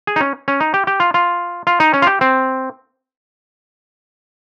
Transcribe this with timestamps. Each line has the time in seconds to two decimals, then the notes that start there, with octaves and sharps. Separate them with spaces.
0.07 G#4
0.16 D#4
0.21 C#4
0.48 C#4
0.60 D#4
0.74 G4
0.87 G4
1.00 F4
1.14 F4
1.67 F4
1.80 D#4
1.94 C#4
2.02 F4
2.07 G4
2.21 C4